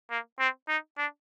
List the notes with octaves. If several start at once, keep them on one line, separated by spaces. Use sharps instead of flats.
A#3
C4
D#4
D4